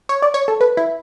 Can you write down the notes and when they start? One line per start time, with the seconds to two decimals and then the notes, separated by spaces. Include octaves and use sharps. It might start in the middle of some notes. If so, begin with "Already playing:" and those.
0.09 C#5
0.22 D5
0.34 C#5
0.48 A4
0.61 B4
0.77 E4